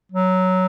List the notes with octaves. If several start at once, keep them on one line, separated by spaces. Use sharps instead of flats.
F#3